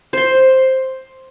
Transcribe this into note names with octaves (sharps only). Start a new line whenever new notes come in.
C5 C6